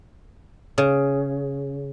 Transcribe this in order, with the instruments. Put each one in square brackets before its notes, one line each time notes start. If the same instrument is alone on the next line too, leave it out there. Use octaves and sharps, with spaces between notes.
[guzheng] C#3